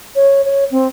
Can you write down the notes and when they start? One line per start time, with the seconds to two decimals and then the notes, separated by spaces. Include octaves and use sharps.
0.16 C#5
0.45 C#5
0.71 C4